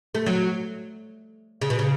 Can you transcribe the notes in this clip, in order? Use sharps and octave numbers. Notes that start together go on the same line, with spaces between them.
A3
F#3
C#3
B2
C#3